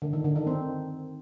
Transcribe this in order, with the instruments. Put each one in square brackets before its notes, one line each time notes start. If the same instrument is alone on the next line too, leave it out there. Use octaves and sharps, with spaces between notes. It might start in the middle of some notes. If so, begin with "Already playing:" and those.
[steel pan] D3
D#3
D3
D#3
C4